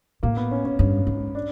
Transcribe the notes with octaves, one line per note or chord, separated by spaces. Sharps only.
A2 A#3
B3
C#4
C#4
G2
G#2
D4